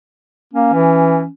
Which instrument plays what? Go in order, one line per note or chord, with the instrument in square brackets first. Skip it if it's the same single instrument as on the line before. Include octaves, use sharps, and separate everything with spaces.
[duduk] A#3 [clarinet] C#4
[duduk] E3